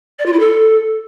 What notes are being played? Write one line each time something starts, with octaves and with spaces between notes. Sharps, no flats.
D5
F4
E4
A4